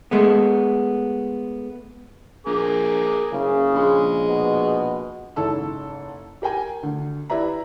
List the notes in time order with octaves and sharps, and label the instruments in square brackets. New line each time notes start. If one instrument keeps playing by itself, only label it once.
[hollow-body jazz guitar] G#3 A3 B3
[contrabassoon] A#1 [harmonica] G#4 A#4 D6
[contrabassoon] F#1 [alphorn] C#3
[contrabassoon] A#1 [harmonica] G#3
[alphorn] B2
[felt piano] F#1 G#2 E4 A4 A5 E6
G4 A#4 G5 G#5
D2
E4 G4 B4 D5 E5 A#5